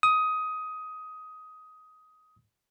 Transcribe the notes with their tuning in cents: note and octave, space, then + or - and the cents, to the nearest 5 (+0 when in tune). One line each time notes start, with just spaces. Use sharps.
D#6 +15